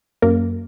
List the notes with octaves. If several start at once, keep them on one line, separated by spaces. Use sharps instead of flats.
F#2 A#3 A#4